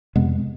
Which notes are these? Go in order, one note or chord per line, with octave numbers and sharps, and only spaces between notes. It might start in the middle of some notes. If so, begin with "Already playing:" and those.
F2 C3 G#3 B3